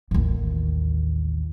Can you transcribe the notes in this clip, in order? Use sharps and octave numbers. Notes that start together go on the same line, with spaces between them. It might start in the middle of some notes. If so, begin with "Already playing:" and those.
A1 D#2